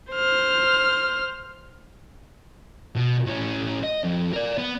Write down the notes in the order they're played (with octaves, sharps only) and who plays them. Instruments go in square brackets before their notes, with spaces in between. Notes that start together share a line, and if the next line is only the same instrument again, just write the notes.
[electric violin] C5 F6
[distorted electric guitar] B2
A2 C#4
D#5
F2
A#4 D5
B3